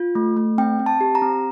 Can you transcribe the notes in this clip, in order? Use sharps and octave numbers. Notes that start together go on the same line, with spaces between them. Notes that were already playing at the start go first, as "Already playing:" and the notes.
Already playing: F4
A3
A3
C4 G5
C4
A5
G4
A#5
C4